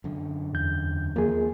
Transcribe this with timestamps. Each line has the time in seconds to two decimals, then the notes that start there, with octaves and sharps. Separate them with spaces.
0.04 F#2 D3
0.53 E2 G6
1.16 D#2 F3 A#3 G#4